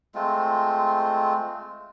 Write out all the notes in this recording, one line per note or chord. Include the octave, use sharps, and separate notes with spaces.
G#3 A3 C4 F4